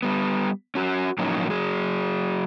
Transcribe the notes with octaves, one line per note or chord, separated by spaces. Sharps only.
G3 B3
C#4 F#4
A2 F3 F#3 A#3 C#4 D#4
F#3 G#4